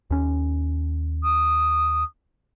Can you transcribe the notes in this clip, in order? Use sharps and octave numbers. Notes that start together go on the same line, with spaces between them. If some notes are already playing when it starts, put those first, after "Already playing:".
D#2 C#4
D#6